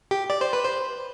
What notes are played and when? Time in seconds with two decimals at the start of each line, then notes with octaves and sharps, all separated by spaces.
0.11 G4
0.30 D5
0.41 C5
0.53 B4
0.64 C5